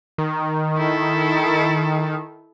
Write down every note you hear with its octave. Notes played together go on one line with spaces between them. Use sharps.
D#3
E4 A4